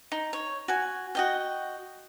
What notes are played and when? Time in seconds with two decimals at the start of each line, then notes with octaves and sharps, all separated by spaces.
0.12 D#4
0.33 C#5
0.68 F#4 G#5
1.15 F#4 D#5 G5